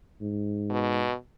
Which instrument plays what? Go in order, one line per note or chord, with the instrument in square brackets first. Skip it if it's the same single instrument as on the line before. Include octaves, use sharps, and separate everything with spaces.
[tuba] G#2
[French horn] B2